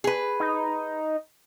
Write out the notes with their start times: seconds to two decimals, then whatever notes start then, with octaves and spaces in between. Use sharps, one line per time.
0.04 G#4 B4
0.40 D#4